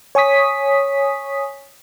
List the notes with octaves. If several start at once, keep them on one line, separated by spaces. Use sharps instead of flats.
C#5 G#5 C#6 D#6 B6